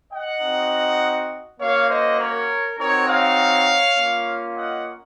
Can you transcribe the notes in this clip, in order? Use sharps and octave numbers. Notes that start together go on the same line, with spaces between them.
D#5 F#5
C4 D#4 F#4
A#3 C#4 F#4 C#5 F5
C5 D#5
A#4 C#5
C4 D#4 F#4 A#4 C#5
C#5 F5
A#3 C#4 F4
D#5 F#5